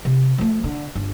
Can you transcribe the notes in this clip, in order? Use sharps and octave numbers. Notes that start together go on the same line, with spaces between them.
C3
F3 A3
D3
G1